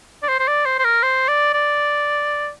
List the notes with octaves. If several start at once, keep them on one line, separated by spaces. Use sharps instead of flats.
D5
C5
C5
D5
C5
C5
A#4
C5
D5
D5